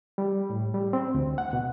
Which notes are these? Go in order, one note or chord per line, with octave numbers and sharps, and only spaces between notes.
G3
A2
G3
C4
D2
F#5
B2